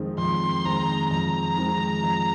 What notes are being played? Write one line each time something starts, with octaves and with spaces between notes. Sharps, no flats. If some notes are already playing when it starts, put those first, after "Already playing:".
Already playing: F2 D#3 G#3 C4
F2 C6
D#3 G#3 C4 A#5
F2 A#5
D#3 G#3 C4
F2